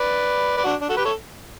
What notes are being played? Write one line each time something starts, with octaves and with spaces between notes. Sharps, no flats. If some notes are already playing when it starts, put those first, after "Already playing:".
Already playing: B4 D5
B4 D5
D4 F#4
D4
F#4 A4
G4 B4
A4 C#5